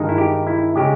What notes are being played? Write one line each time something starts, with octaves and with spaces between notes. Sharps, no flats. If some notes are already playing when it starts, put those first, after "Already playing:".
Already playing: G2 D#3 G#3 D#4
E4
G4
E4
C#3 G#3 G4